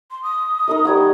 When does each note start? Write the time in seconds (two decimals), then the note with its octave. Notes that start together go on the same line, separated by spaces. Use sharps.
0.11 C6
0.23 D#6
0.68 D#4 A#4 D#5
0.85 G3 C#5 F#5